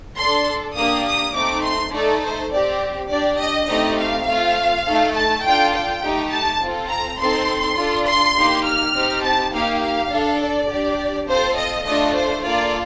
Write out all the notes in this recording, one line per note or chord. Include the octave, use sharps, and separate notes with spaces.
D4 A4 C6
A#3 D4 G4 D#6
D#6
A3 C4 D#4 D6
C6
A3 D#4 A4 D5
C5
C4 G4 D5
D4 G4 D5
D#5
A3 C4 D#4 G4 D#5
F5
A3 C4 F4 F5
A3 D#4 A4
A5
D4 F4 A4 G5
G5
A3 D#4 G4
A5
C4 F4 A4
A#5
C4 D#4 A4 C6
D4 F4 A4
C6
A#3 D#4 G4
F6
C4 D#4 G4
A5
A#3 D#4 G4 F5
F5
D4 A4
D5
D4 G4
C4 F4 A4 C5
D#5
A3 D4 F4 A4 D#5
C5
A#3 F4 A4 D5